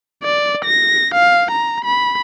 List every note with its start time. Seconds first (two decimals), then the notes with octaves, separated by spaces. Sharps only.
0.23 D5
0.65 A#6
1.14 F5
1.51 A#5
1.85 B5